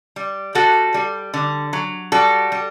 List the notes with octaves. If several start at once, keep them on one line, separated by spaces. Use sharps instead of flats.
G3
G3 F#4 A4
G3
D3
F#3
G3 F#4 A4
G3